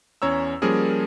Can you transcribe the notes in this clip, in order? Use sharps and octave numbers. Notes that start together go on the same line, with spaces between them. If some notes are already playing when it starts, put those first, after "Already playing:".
E2 C#4 C#5 A#5 E6
F3 G3 A#3 C#4 G#4 A#4